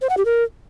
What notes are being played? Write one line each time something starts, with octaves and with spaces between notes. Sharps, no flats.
C5
F#5
G4
A#4